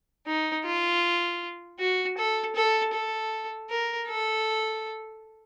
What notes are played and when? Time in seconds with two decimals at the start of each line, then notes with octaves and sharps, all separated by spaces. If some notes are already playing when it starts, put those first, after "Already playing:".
0.27 D#4
0.65 F4
1.79 F#4
2.18 A4
2.56 A4
2.94 A4
3.70 A#4
4.08 A4